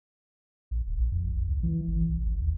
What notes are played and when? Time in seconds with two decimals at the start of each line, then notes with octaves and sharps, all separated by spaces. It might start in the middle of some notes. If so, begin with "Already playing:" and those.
0.71 A#1
0.87 D#1
0.99 A#1
1.12 F2
1.36 A#1
1.47 C#2
1.63 E3
1.88 G#1
2.09 C2
2.26 G#1
2.41 D#2